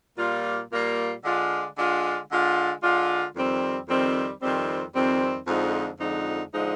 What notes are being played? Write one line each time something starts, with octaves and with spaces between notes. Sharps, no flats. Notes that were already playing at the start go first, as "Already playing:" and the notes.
A#2 G3 A#3 F4
A#2 G3 A#3 F4
D3 G#3 D4 F4
D3 G#3 D4 F4
D3 G#3 D4 F4
D3 G#3 D4 F4
F2 D#3 G3 C4
F2 D#3 G3 C4
F2 D#3 G3 C4
F2 D#3 G3 C4
F2 D3 F3 G#3 D#4
F2 D3 F3 G#3 D#4
D3 F3 G#3 D#4